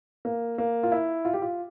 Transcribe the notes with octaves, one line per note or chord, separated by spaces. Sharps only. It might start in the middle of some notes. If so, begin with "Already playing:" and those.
A#3
A#3
F4
E4
F4
G4
F4